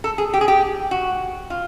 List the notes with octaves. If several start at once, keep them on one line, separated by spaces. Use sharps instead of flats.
A4
G#4
G4
G#4
G4
F#4
F4